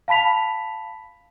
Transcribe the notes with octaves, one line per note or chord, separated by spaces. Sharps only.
F5 A5 B5 B6 F7